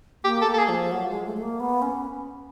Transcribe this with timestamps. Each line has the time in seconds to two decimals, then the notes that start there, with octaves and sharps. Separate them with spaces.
0.24 A#3 G4
0.41 A4
0.47 A#3
0.54 A4
0.58 G#4
0.69 F3
0.91 F#3
1.09 G#3
1.26 A3
1.37 A3
1.42 A#3
1.60 B3
1.82 C#4